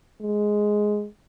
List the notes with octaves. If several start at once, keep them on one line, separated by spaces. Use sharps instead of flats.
G#3